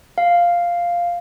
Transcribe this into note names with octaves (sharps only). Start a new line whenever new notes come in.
F5